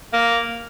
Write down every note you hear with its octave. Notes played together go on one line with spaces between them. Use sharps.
A#3